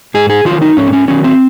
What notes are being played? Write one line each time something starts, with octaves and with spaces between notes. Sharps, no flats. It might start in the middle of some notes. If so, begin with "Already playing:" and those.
G#2 G#4
G#4
D#3 F#3 F4
D#4
G#2 C#4
C4
C#4
D#3 F#3 C#4
C4